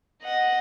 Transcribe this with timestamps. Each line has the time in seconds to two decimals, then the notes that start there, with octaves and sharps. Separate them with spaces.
0.24 D#5 F#5